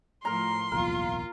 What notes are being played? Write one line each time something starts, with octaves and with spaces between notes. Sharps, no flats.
A2 F3 A#4 A#5 C6
D1 B1 E2 A#3 F4 A#4